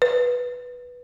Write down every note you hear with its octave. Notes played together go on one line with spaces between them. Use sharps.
B4